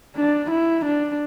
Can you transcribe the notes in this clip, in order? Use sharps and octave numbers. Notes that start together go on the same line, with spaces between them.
D4
E4
D4